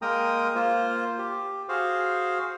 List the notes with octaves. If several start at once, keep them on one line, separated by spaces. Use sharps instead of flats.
G#3 A#3 A#4 G5 A#5 D#6
A#3 F4 C5
G4
F#4 G#4 C5 F5